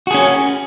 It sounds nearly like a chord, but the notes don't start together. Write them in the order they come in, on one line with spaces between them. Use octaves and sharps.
F#4 G#4 C#4